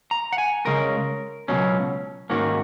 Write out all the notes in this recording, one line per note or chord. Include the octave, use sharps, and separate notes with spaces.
A#5
F#5
G#5
C#3 G#3 C#4 A#4
C#2 B2 F#3 C#4
G#2 D#3 A#3 C#4 F#4